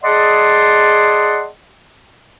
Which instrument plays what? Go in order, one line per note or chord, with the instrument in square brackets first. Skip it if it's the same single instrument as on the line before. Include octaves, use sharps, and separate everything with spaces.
[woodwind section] G#4 D5 D#5 F#5 A5 C6